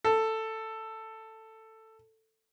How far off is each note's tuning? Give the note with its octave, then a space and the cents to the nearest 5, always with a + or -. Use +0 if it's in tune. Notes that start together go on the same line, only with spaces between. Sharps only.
A4 +10